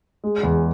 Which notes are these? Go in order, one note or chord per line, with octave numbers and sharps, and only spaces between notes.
G#3
E2